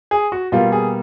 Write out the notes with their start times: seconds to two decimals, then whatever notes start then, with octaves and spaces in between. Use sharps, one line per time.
0.11 G#4
0.32 F#4
0.52 B2 G3 A#3 F4
0.72 G#4